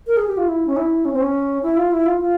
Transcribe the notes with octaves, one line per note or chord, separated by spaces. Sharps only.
A#4
G#4
G4
F4
E4
C#4
E4
C#4
C4
C#4
E4
F4
E4
F4
F4